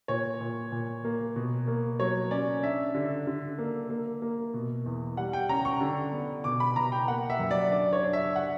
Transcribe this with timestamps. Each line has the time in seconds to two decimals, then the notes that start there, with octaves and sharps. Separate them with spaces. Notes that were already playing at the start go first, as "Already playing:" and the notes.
0.08 A#2 C#5
0.41 A#2
0.72 A#2
1.05 A#3
1.36 B2
1.68 A#3
1.99 F#3 C#5
2.31 C#4 D5
2.63 D4 E5
2.94 D3
3.27 D3
3.58 A#3
3.90 A#3
4.22 A#3
4.54 B2
4.86 E2
5.17 G3 F#5
5.33 G5
5.49 C#4 A#5
5.65 C#6
5.81 D3
6.12 B3
6.44 B2 D6
6.60 B5
6.76 B2 A#5
6.92 G5
7.08 A#3 F#5
7.30 E5
7.39 F#2
7.51 D5
7.71 D4 D5
7.93 C#5
8.03 D4
8.13 E5
8.36 F#5